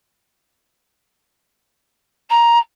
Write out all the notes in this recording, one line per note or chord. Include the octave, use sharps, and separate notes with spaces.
A#5